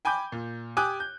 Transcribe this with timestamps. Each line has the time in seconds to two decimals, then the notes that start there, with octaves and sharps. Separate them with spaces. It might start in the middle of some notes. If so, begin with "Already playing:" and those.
0.05 G5 G#5 B5 D6 G6
0.32 A#2
0.77 G4 G#5 D6 D#6 F#6
1.00 G6